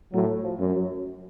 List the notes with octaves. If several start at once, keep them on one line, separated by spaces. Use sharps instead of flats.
A2 F#3
F3
F#2
F#3